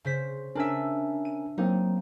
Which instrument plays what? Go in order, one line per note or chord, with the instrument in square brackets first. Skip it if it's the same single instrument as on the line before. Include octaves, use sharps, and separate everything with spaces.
[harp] C#3 C5 B6
[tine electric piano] C#4 A#4 G#5 [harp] D4 E5
[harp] D#7
[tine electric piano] F#3 A#3 C4 [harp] D#4